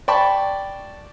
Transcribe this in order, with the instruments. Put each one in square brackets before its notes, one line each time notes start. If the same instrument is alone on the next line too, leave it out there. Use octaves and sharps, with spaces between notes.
[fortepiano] D5 G5 A5 B5 C#6